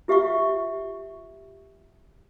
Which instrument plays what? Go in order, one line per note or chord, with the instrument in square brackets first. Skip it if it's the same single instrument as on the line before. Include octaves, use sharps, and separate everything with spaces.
[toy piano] F4 G4 E5 F5 C#6